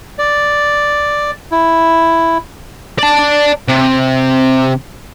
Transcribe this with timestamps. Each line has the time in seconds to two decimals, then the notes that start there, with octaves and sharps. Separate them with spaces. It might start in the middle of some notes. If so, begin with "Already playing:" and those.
0.19 D5
1.52 E4
2.99 D5 A5
3.68 C3